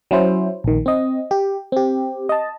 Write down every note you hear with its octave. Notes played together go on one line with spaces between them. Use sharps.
F#3 C#4 E4 C5
A#1 D#3
C4 D#5
G4
C4 G4
D#5 A5